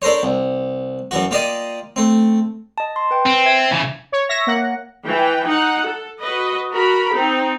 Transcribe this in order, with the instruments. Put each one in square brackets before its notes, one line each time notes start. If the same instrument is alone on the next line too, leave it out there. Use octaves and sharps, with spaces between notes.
[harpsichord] D4 A4 A#4 C5 C#5
C2
F#2 E3 F#4
A#3 F4 G4 D5 D#5
A3 C4
[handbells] D#5 A5
C6
B4 G5
[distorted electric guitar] C4
[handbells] E5 G#6
[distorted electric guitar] C#3 E3
[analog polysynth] C#5
C#5 E5 A#6
A#3 F#5
[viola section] E3 G5
D#4 F#5
A4
F#4 B4 D#5
F#4 A#4 B5
C4 D#4